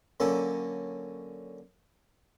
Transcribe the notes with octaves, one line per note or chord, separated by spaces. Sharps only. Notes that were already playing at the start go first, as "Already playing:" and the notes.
D3 F#3 A#3 C#4 A4